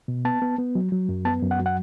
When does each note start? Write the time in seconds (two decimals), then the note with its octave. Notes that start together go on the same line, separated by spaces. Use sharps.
0.08 B2
0.25 B3 A5
0.42 B3
0.58 B3
0.75 F#3
0.92 F#3
1.09 F#2
1.25 B3 A5
1.42 F#2
1.51 F#5
1.59 F#3
1.66 F#5